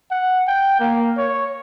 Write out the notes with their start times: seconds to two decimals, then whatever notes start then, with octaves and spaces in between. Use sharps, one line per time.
0.11 F#5
0.47 G5
0.80 A#3
1.18 C#5